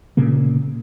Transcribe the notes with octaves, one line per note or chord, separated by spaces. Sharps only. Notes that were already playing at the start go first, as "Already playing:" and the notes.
A#2 C#3 A#3